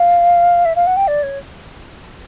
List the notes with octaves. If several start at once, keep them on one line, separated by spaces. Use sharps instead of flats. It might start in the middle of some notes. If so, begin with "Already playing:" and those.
Already playing: F5
E5
F5
F#5
G5
D5
C#5